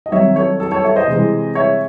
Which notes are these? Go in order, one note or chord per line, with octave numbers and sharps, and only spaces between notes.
D#5
D#3 F#3 C4 C#5 E5
A4 C#5
A4
A4 C#5
C#5 E5
C5 D#5
C3 E3 G#3 C4
C#5 E5